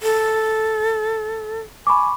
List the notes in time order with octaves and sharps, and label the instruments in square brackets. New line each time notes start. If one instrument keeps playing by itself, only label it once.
[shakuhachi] A4
[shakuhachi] G#5 [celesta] B5 C#6 D6